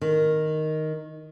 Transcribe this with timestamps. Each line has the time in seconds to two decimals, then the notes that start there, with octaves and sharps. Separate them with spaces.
0.01 D#3